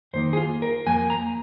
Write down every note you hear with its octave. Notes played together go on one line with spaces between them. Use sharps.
F2 D#3 A#3 D#4 C5
G#4
F4
A#4
F2 F3 A#3 G#5
A#5